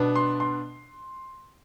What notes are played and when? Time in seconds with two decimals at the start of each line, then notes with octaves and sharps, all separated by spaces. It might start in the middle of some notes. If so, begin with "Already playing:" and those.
Already playing: B2 B3 D4
0.15 C6
0.40 C6